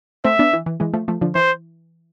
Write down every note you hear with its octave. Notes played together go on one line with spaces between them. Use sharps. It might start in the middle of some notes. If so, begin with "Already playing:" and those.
A3 C4 E5
B3 D4
E3
E3
E3 G#3
F3 A3
F3 A3
D3 F3
E3 C5